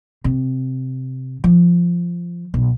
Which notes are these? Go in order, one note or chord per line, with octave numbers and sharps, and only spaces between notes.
C3
F3
B1